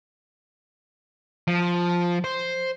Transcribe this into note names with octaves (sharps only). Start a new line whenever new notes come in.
F3
C5